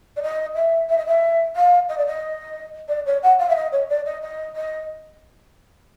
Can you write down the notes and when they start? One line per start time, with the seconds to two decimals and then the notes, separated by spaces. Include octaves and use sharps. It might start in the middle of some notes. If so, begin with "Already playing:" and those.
0.17 D5
0.23 D#5
0.55 E5
0.89 E5
0.98 D#5
1.06 E5
1.56 F5
1.89 D#5
1.98 D5
2.07 D#5
2.88 D5
3.06 C#5
3.23 F#5
3.39 F5
3.49 E5
3.56 D#5
3.72 C#5
3.89 D5
4.06 D#5
4.22 D#5
4.56 D#5